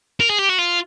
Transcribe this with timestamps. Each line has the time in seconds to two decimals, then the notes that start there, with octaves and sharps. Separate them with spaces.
0.20 A#4
0.30 G#4
0.39 G4
0.49 F#4
0.59 F4